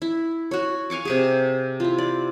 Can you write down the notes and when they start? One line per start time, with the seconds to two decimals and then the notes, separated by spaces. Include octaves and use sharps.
0.02 E4
0.51 F#4 C#5
0.90 F5 G#5 C#6 D6
1.05 C3 G4 G#4
1.80 E4 F4
1.98 D5